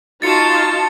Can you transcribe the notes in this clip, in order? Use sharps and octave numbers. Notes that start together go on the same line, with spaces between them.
D#4 F4 F#4 A5 A6 C#7